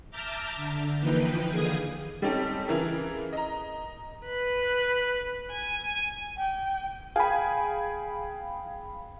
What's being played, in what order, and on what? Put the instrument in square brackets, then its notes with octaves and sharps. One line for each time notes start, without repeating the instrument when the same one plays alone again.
[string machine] E5 A5 A#5 D6 F6 G6
D3
E3 F3 A#3 D#4 B4 G5
D#2 D3 F4 G#4 D#6 G#6
[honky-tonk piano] G3 C4 C#4 D#4 G4 A4
C#3 E3 E4 G#4 A#4
D#5 A#5
[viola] B4
G#5
[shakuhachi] G5
[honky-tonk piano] G#4 G#5 [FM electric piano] F5 B5 [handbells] G5